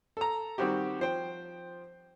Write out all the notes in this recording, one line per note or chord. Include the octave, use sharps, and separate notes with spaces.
A4 A#5
D#3 G3 C4 F#4 G4
F3 C5 G5